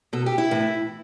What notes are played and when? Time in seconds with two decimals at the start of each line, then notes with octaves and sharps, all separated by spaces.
0.13 B2 A4
0.26 G4
0.38 E4
0.51 A2 E3